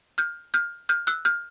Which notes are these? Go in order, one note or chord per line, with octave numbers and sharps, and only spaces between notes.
F6 G6
F6 G6
F6 G6
E6 F#6
F6 G6